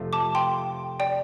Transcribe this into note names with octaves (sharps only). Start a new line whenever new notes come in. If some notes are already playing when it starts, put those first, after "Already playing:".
Already playing: F2 C3 A3 F4
A5 D6
G5 C6
D5 G5